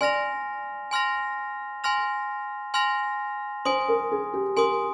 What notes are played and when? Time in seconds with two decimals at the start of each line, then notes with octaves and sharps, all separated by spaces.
0.01 D5 G#5 C6 F6 A#6 F7
0.91 G#5 C6 F6 A#6 F7
1.84 G#5 C6 F6 A#6 F7
2.74 G#5 C6 F6 A#6 F7
3.65 C5 G#5 C6 D#6
3.88 A#4
4.12 G#4
4.34 G4
4.57 A#4 G#5 C6 D#6